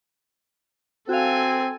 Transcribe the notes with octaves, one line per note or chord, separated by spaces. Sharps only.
C4 F#4 A4 F5 G#5